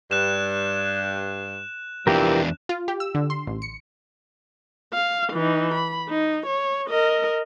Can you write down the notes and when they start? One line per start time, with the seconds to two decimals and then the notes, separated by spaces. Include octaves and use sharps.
0.11 G2 F#6 E7
2.07 E2 E3 F3 C4 D4 G4 A#4
2.69 F4
2.88 G4
3.00 E6
3.15 D3
3.30 C6
3.47 A1
3.62 C#7
4.93 F5
5.33 E3 D#4
5.74 B5
6.09 D#4
6.46 C#5
6.88 A#4 D#5